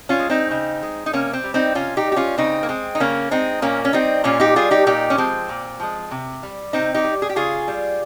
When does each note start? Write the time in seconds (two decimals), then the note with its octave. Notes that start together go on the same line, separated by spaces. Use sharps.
0.09 C#4 F4
0.19 G#3
0.30 C4 D#4
0.51 C#3
0.83 G#3
1.06 D#4
1.13 C3 A#3 C#4
1.33 C4
1.44 G3
1.54 C4 D#4
1.75 C3 C#4 F4
1.97 D#4 G4
2.07 G3
2.12 G4
2.16 C#4 F4
2.38 C#3 C4 D#4
2.63 A#3
2.69 G#3 C4
2.95 D#4
3.00 C#3 A#3 C#4
3.31 G#3 C4 D#4
3.62 A#2 A#3 C#4
3.85 C#4
3.93 G3 C4 D#4
4.24 A#2 C#4 F4
4.39 D#4 G4
4.56 G3 F4 G#4
4.71 D#4 G4
4.86 A#2 D#4 G4
5.10 C#4
5.18 F3 G#3 C4
5.49 A#2
5.80 F3 G#3
6.11 C3
6.43 G3
6.73 C3 C4 D#4
6.94 D#4 G4
7.04 G3
7.22 G#4
7.29 G4
7.36 C#3 F4 G#4
7.68 G3